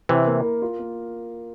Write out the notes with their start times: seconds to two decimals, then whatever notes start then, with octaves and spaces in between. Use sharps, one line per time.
0.09 C3 E3 E4
0.26 A#3
0.44 A#4
0.62 F4
0.79 A#3